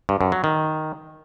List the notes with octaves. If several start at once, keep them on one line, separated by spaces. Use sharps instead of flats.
G2
F#2
F#3
D#3